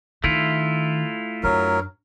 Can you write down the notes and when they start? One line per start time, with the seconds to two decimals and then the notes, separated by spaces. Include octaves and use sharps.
0.24 D#3 A3 E4 F4
1.44 F#2 F#3 D4 A#4